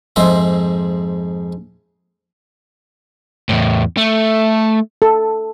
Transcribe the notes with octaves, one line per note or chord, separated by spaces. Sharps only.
F2 G#2 G#3 C5 E5
E2 A2
A3
A4